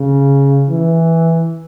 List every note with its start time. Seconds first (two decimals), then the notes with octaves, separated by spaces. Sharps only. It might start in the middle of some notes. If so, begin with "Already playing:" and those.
Already playing: C#3
0.70 E3